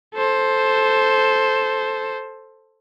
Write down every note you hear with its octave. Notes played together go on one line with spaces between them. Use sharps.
A4 C5